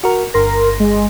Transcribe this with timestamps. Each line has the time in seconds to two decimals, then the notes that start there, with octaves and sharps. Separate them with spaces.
0.04 F#4 A#4
0.34 G1 A#4 C6 A#6
0.80 G#3